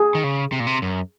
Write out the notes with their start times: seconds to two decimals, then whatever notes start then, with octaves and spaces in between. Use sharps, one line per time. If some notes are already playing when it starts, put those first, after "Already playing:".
Already playing: G#4
0.15 D#3
0.24 C#3
0.52 C3
0.60 A#2
0.67 C3
0.82 F#2